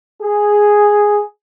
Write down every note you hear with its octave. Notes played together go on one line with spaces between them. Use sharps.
G#4